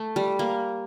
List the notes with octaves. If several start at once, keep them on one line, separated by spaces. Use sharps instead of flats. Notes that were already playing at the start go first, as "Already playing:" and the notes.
Already playing: A3
G3
A#3